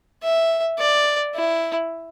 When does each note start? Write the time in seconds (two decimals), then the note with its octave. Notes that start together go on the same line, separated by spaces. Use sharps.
0.23 E5
0.79 D5
1.35 E4